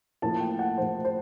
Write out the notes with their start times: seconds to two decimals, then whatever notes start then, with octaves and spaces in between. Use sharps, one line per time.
0.22 A2 F3 A#3 A5
0.40 G5
0.59 F#5
0.77 A2 F3 A#3 C5
1.05 C5